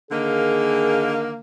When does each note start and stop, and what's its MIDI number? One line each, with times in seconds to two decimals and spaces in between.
0.11 1.39 50
0.11 1.39 51
0.11 1.39 58
0.11 1.24 68